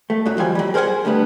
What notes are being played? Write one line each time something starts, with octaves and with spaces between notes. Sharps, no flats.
A3
F#2 F#3
D#2 F3 G3 G#5
F#3 G3
G#4 A#4 C5 C#5 F#5 G#5
D3 G3 A3 B3